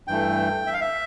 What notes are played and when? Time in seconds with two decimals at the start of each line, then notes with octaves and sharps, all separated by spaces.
0.07 G2 E3 A3 G5
0.67 E5
0.73 F5
0.81 E5